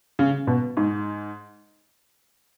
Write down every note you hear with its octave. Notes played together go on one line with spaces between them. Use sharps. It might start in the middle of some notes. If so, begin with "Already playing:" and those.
C#3
B2
G#2